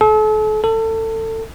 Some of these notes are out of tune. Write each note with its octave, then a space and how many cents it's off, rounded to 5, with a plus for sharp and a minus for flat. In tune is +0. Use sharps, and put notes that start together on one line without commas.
A4 -40
A4 +25